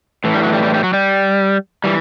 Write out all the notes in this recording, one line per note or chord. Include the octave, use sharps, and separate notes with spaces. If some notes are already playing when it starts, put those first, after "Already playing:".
A2 E3
G3
F#3
G3
G3
G3
F#3
G3
E3 G3